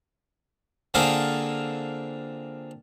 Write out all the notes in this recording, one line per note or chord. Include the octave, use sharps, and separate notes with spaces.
D3 A#3 C4 F4 G#4 A4